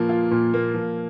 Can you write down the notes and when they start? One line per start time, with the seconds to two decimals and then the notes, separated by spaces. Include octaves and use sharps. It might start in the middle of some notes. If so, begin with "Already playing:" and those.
Already playing: A#2 F3 A#3
0.09 F4
0.31 A#2
0.54 A#3
0.74 F3